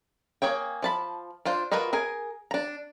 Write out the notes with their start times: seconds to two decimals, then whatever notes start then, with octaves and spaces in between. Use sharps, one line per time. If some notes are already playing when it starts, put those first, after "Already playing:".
0.42 A#3 G#4 C#5 G5
0.82 F3 A5 B5
1.45 D4 F4 C5
1.72 F4 F#4 A#4 B4 D#5
1.93 G#4 A#4 G#5
2.51 D4 A#5